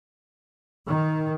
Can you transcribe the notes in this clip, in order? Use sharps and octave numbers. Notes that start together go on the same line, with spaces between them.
D#3